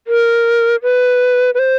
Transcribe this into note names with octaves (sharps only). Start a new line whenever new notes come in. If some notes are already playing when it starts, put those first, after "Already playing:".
A#4
B4
B4
C5